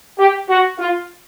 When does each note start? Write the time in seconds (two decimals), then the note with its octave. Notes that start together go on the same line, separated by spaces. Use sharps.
0.18 G4
0.49 F#4
0.78 F4